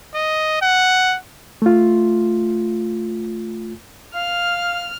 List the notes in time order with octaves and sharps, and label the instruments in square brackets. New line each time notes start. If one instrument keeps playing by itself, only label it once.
[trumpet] D#5
F#5
[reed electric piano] A3 F4
[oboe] F5 [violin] F6